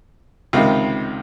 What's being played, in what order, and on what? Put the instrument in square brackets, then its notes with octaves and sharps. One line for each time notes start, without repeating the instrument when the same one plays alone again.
[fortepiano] C#2 C3 D#3 F4